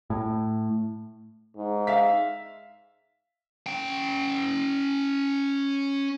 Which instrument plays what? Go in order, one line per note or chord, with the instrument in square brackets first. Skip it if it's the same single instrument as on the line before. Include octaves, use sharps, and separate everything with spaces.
[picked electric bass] A2
[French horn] G#2
[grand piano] E5 F5 B6
[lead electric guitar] C#4 G5